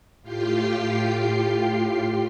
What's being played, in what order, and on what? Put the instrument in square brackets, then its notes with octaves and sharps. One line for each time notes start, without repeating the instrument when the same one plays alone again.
[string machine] A2 F4 G4 G5 C7